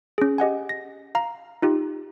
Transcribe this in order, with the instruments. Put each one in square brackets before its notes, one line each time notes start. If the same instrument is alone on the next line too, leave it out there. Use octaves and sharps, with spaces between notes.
[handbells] C#4 G#4
G4 D#5 F#5 G#5
A#6
F5 A#5
D#4 F4 G4